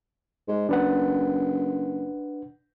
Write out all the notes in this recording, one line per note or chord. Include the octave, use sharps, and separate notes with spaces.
G#2
F#1 D4 B4 F#5